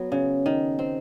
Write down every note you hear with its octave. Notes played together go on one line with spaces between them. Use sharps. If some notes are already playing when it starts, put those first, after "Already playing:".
Already playing: F#3 B3
C#3
D#3
C4